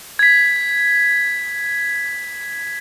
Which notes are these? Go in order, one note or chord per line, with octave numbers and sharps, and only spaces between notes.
G#6 B6